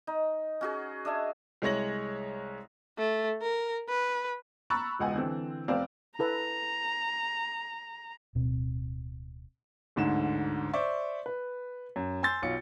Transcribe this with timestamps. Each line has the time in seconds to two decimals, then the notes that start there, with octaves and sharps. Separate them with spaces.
0.07 D#4
0.61 C#4 F#4 G#4
1.05 D4 D#5 E5 G#5
1.62 C2 G#3 C#5 A#6 F#7
2.98 A3
3.42 A#4
3.89 B4
4.70 A#5 B5 C#6 E6 F#6 A6
4.99 E1 C#2 D#5 F#5 G#5
5.15 D3 E3 C4
5.68 F1 C4 D5 F5
6.19 E4 A4 B4 A#5
8.35 D1 B2 C4
9.96 A1 D2 G#2 D3 E7
10.73 C5 D5 E5 C#6
11.26 B4
11.96 F#2
12.23 G#5 C6 E6 G6 A6
12.42 B1 F4 C#7